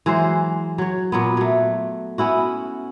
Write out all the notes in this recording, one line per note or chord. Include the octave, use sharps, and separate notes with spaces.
E3 F#3 G#3 C5
F#3 C#5
A#2 F#3 B3
F#3 A3
B3 C#4 E4 F#4